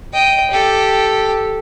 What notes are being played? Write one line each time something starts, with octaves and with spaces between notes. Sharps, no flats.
D#5 G5
G4 A4